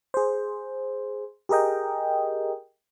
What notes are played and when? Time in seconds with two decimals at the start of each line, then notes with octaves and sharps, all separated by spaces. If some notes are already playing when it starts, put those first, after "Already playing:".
0.14 G#4 C5
1.49 G4 G#4 A#4 D#5 G5